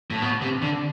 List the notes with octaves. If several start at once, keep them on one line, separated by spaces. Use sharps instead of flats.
A2
B2
C3
D3